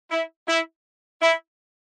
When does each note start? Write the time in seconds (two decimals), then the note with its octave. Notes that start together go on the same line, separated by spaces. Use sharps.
0.11 E4
0.48 E4
1.22 E4